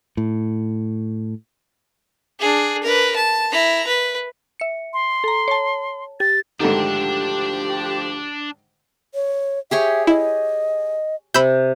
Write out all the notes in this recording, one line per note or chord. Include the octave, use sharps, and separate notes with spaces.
A2
D4 G#4
A#4 B4
A5
E4 A#5
B4
E5 C#7
C6
A4 A#5
C#5 A5
G4 A6
D2 G#2 D3 D#3 F3 D4 G4 A5
C#5
G4 G#4 C#5 E5
E4 D#5
C3 B5 E6 G6